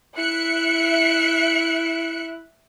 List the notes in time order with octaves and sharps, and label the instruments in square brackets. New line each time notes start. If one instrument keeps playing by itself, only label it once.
[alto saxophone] E4 [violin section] E5 F#6 C#7